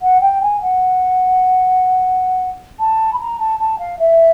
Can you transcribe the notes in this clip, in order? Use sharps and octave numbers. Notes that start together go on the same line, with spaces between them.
F#5
G5
G#5
F#5
A5
B5
A#5
A5
A5
F5
E5